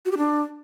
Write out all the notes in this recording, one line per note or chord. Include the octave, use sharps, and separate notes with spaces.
F#4
G4
D4